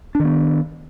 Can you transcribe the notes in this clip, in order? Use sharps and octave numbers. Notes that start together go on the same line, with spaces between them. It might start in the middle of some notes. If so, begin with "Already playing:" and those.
D#3 B3 D4